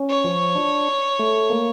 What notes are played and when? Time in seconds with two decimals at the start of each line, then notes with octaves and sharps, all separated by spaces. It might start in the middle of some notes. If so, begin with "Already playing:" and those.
Already playing: C#4
0.09 C#5
0.24 F3
0.55 D4
1.19 A3
1.50 A#3